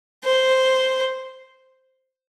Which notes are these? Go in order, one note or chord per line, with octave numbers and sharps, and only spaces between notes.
C5